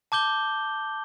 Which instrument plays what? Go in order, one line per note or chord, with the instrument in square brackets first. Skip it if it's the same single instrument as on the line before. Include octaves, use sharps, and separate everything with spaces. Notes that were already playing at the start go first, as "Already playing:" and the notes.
[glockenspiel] A5 D6 G6 G7